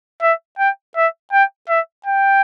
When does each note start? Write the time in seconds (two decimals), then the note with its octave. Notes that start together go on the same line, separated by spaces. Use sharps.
0.22 E5
0.59 G5
0.96 E5
1.33 G5
1.69 E5
2.06 G5